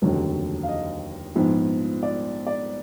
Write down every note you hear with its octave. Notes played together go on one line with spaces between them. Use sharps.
F1 D#2 D3 F#3
F5
D#5
A#1 G#2 F3 B3
D5
D5